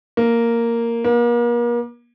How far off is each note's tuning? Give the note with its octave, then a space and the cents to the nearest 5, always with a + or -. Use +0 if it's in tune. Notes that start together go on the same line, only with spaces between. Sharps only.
A#3 -5
A#3 +40